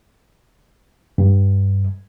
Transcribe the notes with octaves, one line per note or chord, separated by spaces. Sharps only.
G2